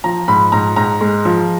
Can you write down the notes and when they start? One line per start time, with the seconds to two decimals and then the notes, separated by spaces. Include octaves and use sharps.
0.04 F3 A#5
0.28 G#2 B5
0.52 G#2 A#5
0.76 G#2 A#5
1.01 G#3
1.25 F3